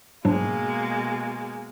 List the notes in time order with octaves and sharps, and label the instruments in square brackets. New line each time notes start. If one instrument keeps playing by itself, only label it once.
[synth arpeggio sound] G#2 F#3 D4 [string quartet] B2 G#3 A#3